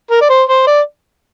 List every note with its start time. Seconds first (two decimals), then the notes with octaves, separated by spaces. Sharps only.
0.11 A#4
0.21 D5
0.30 C5
0.49 C5
0.67 D5